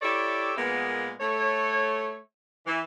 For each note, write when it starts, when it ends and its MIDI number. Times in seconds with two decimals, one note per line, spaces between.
0.02 0.51 64
0.02 0.51 67
0.02 0.51 69
0.02 0.51 73
0.02 0.51 74
0.02 0.51 76
0.56 1.13 46
0.56 1.13 56
0.56 1.13 58
0.56 1.13 59
1.20 2.18 57
1.20 2.18 73
2.66 2.81 52